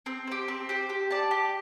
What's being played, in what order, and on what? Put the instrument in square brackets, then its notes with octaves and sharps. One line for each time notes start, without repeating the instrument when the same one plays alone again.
[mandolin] C4
G4 C5
C4
G4 C5
G4
D5 A5
G4